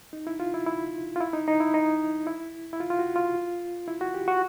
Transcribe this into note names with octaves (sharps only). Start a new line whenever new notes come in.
D#4
E4
F4
E4
E4
F4
E4
D#4
D#4
E4
D#4
E4
E4
F4
F4
F#4
F4
E4
F#4
G4
F#4